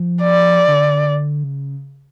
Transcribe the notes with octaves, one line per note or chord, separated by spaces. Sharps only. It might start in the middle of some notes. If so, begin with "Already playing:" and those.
Already playing: F3
D5
D3
C#3